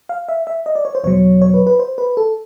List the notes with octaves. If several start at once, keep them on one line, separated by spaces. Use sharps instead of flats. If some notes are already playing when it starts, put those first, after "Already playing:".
F5
E5
E5
D#5
D5
C#5
C5
E2 B2 F#3 C#5
C#5
B4
B4
C5
B4
A4